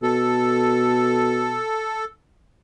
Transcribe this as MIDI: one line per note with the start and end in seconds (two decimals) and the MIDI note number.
0.03 1.62 47
0.03 2.05 69